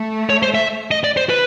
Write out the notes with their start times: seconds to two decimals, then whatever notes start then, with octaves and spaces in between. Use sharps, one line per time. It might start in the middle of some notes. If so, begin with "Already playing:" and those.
Already playing: A3
0.30 C#5
0.43 C5
0.55 E5
0.91 D#5
1.04 D5
1.17 C5
1.29 B4